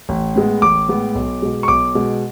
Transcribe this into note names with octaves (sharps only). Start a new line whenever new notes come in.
A1
A2 G#3 B3
A1 D6
A2 G#3 B3
B1
B2 G#3
C#6
B1 D6
B2 G#3